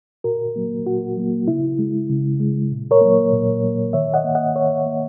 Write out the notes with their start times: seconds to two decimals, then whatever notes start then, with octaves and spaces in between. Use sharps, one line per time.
0.24 A#2 F#4 A#4
0.56 F#3 A#3
0.87 A#2 F#4
1.17 F#3 A#3
1.48 C#3 E4
1.79 G#3
2.10 C#3
2.40 G#3
2.71 A#2
2.91 A#4 C#5
3.01 F#3 A#3
3.32 A#2
3.63 F#3 A#3
3.93 D#3 C#5 E5
4.14 D#5 F#5
4.24 A#3
4.35 D#5 F#5
4.55 D#3 C#5 E5
4.86 A#3